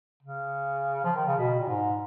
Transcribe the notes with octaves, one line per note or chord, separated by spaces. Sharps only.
C#3
F3
D#3
C#3
B2
A#2
G#2